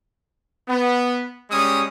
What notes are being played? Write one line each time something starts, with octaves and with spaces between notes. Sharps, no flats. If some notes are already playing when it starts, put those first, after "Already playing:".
B3
G3 G#3 C#4 D#6